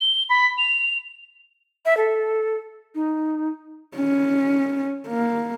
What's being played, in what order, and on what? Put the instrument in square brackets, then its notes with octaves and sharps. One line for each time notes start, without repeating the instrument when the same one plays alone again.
[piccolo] G7
B5
F7
[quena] E5
A4
D#4
[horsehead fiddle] C#4
A#3